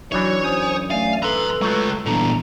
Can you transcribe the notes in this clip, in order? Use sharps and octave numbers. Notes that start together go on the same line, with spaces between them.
E3 F#3 D4 D#4 F#4 C#5
F#2 C5 G#5 D#6
A3 D5 F5 G#5
A4 B4 A#5 C6
F#3 G#3 A3 F4
G1 A#2 E3 A4 A#5